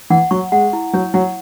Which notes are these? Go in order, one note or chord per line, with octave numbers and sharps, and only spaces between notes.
E3 F#5
F#3 C#6
G#3 F#5
E4
F#3 C#5
F#3 F#5